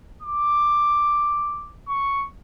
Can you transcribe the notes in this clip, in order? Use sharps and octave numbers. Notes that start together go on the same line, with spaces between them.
D6
C#6